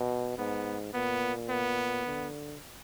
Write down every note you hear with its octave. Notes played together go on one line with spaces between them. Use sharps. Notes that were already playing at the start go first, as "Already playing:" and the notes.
Already playing: B2
G#2 B3
A#2 B3
B3
D3